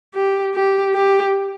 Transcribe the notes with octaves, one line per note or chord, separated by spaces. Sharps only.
G4
G4
G4